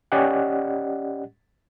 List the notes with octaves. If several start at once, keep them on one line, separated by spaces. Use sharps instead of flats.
C#4 G4 D5 D#5 F#5